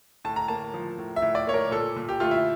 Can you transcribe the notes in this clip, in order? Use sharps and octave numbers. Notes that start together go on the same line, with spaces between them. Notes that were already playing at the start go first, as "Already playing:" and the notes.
A2 A5
A#5
A#3 A5
F3
A2
E5
A2
D5
A#3 C#5
A#4
A#2 A4
A#2
G4
A3 F4
E4